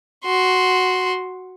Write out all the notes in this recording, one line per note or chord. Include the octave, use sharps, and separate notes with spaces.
F#4 C6